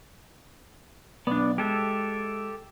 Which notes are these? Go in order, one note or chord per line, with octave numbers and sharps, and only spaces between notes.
B1 B3 D4 D5
G#3 G4 A4 E5